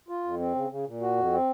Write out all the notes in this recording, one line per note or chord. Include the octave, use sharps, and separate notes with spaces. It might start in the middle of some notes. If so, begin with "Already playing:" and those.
F4
F2
C4
C#3
C#3
A#2
F#4
F2
C4